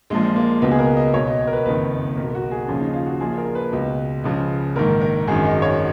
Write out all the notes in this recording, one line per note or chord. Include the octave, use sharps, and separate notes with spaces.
A#1 A#2 F3 G#3
A#3
C#2 B2 B3
G#4
A#4
D#5
B1 B2 C#5
D#5
A#4
B4
F#1 F2 D#3 B4
B1 B2 A#4
F#4
G#4
D#2 C#3 F3 C#4
D#4
F4
F#4
A#1 A#2 F3 G#4
A#4
B4
C#2 B2
C#2 C#3 F3
A#1 G#2 D#3 A#4
A#4
G#1 F#2 D#3 G#4
D#5
C#5